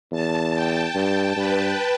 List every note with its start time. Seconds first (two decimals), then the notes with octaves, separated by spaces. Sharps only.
0.12 E2 A5
0.54 G5
0.95 G2 G5
1.37 G2 B4